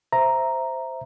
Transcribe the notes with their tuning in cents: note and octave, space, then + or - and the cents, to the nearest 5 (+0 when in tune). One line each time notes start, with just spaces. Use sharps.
C5 +0 E5 +0 A#5 +0